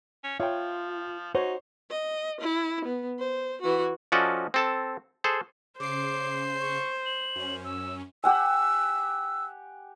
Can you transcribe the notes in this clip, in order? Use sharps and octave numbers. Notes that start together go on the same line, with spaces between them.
C#4
F3 F4 C#5 E5 G5
D#4 F#4 C5 C#5
D#5
E4
B3
C5
E3 F#4
F3 C#4 F#4 A4 D5 D#5
C4 A4 A5
G#4 A4 C5
C#3 C5 D6 C7
C#6
F#7
F#2 C#4
E6
G4 F#5 G#5 E6